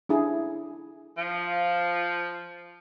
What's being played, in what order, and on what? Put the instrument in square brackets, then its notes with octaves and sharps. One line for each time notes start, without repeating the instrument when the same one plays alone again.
[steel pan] D4 E4 G#4
[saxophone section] F3